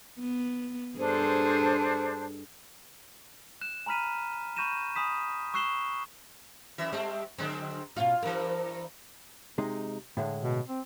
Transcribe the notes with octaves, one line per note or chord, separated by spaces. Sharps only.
B3
G2 D4 G#4 A4 C5
F#6 E7
G#5 A#5 B5 F6 B6 D#7
B5 C#6 G6 A#6 D#7 E7
G#5 B5 D#6 B6 E7
C#6 E6 F#6 C7 E7 G7
F#2 E3 E5
G3 A3 C4 F#4
D3 F#3 G#3 C4
B2 C#4 F4 F5
G2 E3 A#4
C3 G#3 D#4
A2 D3 G#3
B2
C4